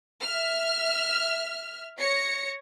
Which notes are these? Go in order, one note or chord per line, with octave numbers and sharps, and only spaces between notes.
E5 F6
C#5 A#6 C#7